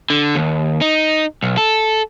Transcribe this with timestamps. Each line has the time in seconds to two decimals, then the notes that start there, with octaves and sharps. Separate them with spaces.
0.10 D3
0.35 D#2
0.81 D#4
1.43 B1
1.57 A4